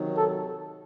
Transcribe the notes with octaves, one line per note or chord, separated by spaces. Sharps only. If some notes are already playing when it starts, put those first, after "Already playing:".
Already playing: C3 D#3 F#3
A4